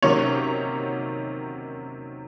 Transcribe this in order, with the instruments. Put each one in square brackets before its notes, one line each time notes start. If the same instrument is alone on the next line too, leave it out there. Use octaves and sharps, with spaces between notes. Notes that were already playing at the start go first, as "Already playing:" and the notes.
[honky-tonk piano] C3 D#3 F#3 A#3 C#4 C#5